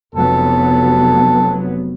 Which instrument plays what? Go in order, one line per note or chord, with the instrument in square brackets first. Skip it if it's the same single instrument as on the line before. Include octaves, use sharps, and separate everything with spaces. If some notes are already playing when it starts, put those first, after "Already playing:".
[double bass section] F1 F#3 B3 [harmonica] A4